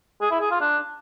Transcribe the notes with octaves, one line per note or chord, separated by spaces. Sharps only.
G#4
E4
G#4
F4
D4